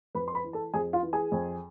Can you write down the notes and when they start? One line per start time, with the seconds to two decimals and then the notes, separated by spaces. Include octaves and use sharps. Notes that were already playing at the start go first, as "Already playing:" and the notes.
0.15 F2 B4 B5
0.28 C6
0.34 B4 B5
0.44 E3
0.53 A4 A5
0.74 F2 G#4 G#5
0.93 F4 F5
1.03 E3
1.13 G#4 G#5
1.32 F2